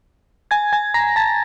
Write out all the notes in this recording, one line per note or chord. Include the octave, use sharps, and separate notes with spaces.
G#5 G#6
G#5 G#6
A#5 A#6
A5 A6